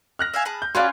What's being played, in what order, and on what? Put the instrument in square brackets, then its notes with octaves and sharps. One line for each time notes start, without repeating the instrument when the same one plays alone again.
[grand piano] F6 F#6 A#6
[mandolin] E5 F5 G#5
G#4 A5 B5
[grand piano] G6
[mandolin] C#4 F4 B4 [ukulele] F#4 D5 F5 [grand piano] C6